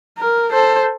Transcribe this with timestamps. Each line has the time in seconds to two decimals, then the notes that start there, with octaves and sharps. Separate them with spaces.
0.18 A#4
0.51 A4 C5